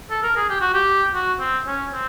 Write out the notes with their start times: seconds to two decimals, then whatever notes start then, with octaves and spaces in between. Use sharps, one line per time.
0.11 A4
0.23 A#4
0.37 G#4
0.49 G4
0.61 F#4
0.74 G4
1.14 F#4
1.40 C4
1.66 C#4
1.93 C4